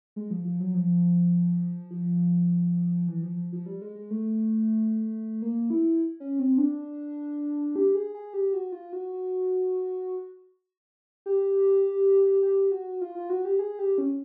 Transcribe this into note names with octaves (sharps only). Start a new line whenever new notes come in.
G#3
F3
F3
F#3
F3
F3
E3
F3
F3
G3
G#3
G#3
A3
A#3
E4
C#4
C4
D4
G4
G#4
G#4
G4
F#4
F4
F#4
G4
G4
F#4
F4
F4
F#4
G4
G#4
G4
C#4